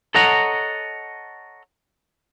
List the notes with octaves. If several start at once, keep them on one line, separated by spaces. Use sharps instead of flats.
A4 C#5 D#5 F#5 A#5